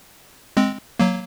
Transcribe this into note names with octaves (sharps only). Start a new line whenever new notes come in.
G#3 C4
F#3 A#3